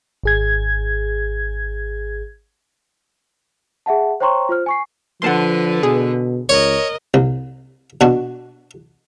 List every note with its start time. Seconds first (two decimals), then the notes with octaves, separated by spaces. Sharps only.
0.24 G#1 G#4 G#6
3.86 G#4 E5 F#5 A5
4.20 C5 C#5 G5 A#5 C6 C#6
4.49 F4 C5 F6
4.66 G#5 C#6 C7
5.22 D3 F3 B4 F#5 A5 C6
5.83 B2 G#4
6.49 C#2 A#4 C#5 D#5
7.14 C2
8.01 B2 D4 F#4